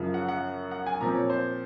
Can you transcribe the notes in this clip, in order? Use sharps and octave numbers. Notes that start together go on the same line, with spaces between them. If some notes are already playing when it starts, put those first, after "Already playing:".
Already playing: F#2 C#3 F3
F#5
F#5
F#5
G#5
A#2 F3 C4 A#5
C#5
C5